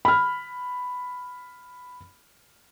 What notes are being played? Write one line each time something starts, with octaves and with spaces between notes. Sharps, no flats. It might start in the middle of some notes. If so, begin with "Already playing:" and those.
B5 F6